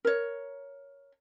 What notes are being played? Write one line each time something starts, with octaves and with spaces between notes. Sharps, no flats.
A#4 C#5